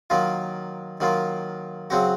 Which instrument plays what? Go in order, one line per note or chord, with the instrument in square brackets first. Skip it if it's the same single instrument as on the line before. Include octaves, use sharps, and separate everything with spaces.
[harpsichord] D#3 F#3 A#3 F4
D#3 F#3 A#3 F4
C#3 F#3 C4 F#4